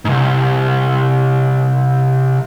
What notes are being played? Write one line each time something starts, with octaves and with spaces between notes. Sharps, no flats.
C2 G#2